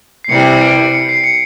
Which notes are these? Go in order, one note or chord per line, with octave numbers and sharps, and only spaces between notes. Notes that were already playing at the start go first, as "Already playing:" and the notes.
C7
C3 E3 G3 C#7
D7
C#7
C7
C#7